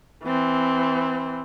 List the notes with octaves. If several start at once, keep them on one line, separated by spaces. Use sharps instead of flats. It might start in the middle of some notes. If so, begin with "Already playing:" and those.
E3 C4